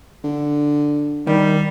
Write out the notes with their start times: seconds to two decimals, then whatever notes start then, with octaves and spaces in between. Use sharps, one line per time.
0.24 D3
1.27 D#3 G3